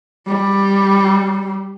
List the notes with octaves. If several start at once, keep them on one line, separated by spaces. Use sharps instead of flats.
G3